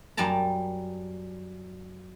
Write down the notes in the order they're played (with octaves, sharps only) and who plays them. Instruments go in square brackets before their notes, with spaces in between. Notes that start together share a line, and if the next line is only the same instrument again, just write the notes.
[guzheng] F#2 G3 D5 A5 A#5